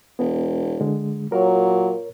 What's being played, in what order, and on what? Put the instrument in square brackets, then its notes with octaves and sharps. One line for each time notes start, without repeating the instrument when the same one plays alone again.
[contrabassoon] E1 [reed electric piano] B3
[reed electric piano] D3 G#3
[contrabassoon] A#2 [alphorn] F#3 [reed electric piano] A#4 C#5